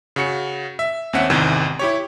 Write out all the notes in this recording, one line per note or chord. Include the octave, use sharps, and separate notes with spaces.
C#3 F#4 C#7
E5
D#2 C4 C#4 E5 F#5
G#1 E2 C3 D#3 E3
E4 G4 C#5